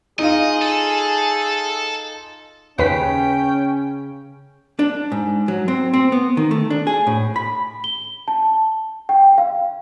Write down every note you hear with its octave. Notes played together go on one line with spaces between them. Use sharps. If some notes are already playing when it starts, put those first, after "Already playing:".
D#4 F4 G#4 D#5
A4
D#2 C#3 C#4 B4 G5 B6
D4
G#2
F#3
C4
C4
B3
D#3
A3
D4
G#4
A2
B5
G7
A5
G5
F5